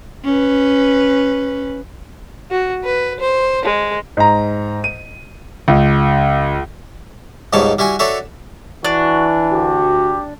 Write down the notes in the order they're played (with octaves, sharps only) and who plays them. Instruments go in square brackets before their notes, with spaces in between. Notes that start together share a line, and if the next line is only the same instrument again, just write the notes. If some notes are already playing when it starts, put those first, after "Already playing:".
[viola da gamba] C#4 B4
[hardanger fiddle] F#4
B4
C5
G#3
[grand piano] G#2 A#5
D#7
C#2
[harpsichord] C#2 G#2 B2 G3 C#5 A5
G3 E4 F#4 G#5
D4 F#4 A4 C#5 E5
[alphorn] E3 [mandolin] D4 [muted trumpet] F#4
[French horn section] D2 F#4 [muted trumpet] G4